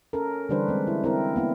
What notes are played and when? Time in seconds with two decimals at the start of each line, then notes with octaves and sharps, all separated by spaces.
0.13 C#4 A4 A#4
0.49 D3 E3 G3 D4 B4 C5
0.69 G#3 C4
0.87 E4
1.04 C4 E4 A#4
1.36 A#3 B3 E4